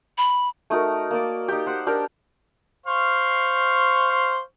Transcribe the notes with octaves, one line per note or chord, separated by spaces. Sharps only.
B5
A3 D#4 F#4 A#4
A#3 D5
D#4 G4
C5 F#5
D4 G4 A#4
C5 F5 C#6